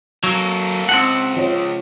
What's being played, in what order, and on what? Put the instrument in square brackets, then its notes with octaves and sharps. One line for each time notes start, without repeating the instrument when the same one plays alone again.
[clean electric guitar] F#3 [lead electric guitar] A#3 A4
[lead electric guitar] C#2 [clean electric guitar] C4 F#5 [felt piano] A5
[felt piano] F3 C#5